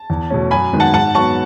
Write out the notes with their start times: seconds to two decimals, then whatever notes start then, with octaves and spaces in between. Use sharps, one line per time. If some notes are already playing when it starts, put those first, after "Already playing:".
Already playing: A5
0.10 E2
0.30 B2 A3 C#4
0.51 F#2 G#5 B5
0.73 D#3 G#3 B3
0.80 F#5 A5
0.94 G#2 F#5 A5
1.15 F#3 B3 A5 C#6